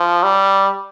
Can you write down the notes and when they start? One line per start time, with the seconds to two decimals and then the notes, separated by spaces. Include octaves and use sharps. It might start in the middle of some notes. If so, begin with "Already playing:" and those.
Already playing: F3
0.23 G3